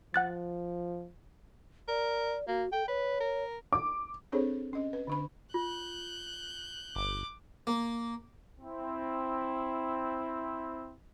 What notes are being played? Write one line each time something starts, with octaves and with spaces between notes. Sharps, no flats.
F3 F#5 F#6 A6
A#4 D5
A#3 F#4
A4 G5
B4 C#5
A#4
D6
C4 D4 G#4 A4 C5 C#5
C#4 D#5
B4
D3 D4 B5
F4 F#6 G6
G1 D6
A#3
C4 E4